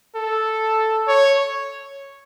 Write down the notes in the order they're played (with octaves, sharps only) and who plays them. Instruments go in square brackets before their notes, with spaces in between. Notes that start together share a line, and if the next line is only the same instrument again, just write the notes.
[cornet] A4
C#5